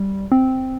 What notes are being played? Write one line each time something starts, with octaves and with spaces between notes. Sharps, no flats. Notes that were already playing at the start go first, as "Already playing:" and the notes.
Already playing: G3
C4